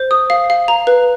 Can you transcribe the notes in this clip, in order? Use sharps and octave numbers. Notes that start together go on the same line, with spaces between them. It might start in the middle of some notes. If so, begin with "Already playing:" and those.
Already playing: C5
D#6
F5
F5
A#5
B4